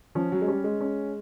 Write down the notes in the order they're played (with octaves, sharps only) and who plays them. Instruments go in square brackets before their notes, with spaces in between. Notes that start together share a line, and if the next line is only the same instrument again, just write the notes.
[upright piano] F3 [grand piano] C#4
[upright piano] F#3
G#3
[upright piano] G3 [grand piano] C#4
[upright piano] G#3
[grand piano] C#4